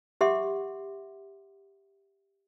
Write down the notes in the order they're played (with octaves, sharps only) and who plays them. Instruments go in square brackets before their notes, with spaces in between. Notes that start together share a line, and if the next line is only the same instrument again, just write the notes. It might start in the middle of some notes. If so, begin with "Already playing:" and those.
[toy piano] G4 E5 F#5 C6 D6